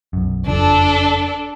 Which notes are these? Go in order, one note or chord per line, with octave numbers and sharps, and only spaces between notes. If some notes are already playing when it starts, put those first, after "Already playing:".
B1 F#2
F#1 F2 F3 D4 A4